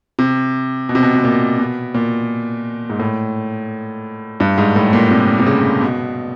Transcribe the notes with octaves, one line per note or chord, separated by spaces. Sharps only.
C3
B2
C3
B2
B2
A#2
B2
A#2
G#2
A2
G2
G#2
A2
A#2
C3
C3
C#3
B2